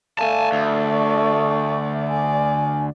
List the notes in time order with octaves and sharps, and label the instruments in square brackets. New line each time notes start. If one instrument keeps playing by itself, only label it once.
[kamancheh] A3 D5 [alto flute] F5 [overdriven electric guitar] G#5 A5
[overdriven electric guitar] D2
[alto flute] C#6
[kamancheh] D5 [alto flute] G#5